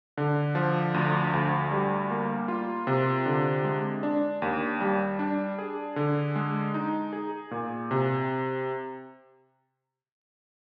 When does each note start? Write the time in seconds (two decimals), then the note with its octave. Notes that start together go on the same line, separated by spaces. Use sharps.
0.17 D3
0.55 F3
0.94 D2
1.33 D2
1.71 G3
2.11 A#3
2.48 F4
2.87 C3
3.26 D3
3.64 G#3
4.03 D4
4.42 D#2
4.80 G3
5.19 D4
5.59 G#4
5.96 D3
6.36 G#3
6.74 D#4
7.13 G#4
7.51 A#2
7.91 C3